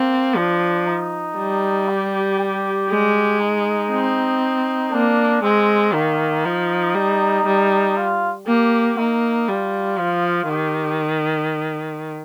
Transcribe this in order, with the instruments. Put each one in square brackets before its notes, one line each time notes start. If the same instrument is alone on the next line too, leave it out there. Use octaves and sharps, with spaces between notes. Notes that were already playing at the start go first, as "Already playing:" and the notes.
Already playing: [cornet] A#3 [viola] C4
[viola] F3 [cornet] D4
[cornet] D#4
[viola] G3
[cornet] G4
G4
[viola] G#3
[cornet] D#4
[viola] C4
[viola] A#3 [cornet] D4
[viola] G#3 [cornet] C4
[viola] D#3 [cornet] A#3
[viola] F3 [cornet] D#4
[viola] G3
G3
[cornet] F4
[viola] A#3 [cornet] G4
[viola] A#3 [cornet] D#4
[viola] G3 [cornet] F4
[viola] F3
[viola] D#3 [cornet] G4